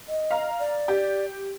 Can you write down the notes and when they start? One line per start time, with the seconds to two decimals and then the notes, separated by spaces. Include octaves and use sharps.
0.09 D#5
0.31 F5 A#5
0.59 D5
0.88 G4